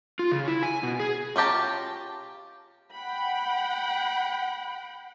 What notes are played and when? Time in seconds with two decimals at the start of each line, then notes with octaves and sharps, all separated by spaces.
0.19 F4
0.32 C#3
0.48 E4
0.63 G#5
0.83 B2
1.00 G#4
1.36 C#4 F4 G4 A5 A#5
2.92 F#5 G5 B5